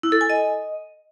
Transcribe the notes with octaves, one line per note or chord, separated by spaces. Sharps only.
E4
A4
G#5
D#5